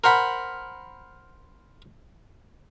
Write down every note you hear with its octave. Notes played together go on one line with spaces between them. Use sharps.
A#4 C5 F#5 B5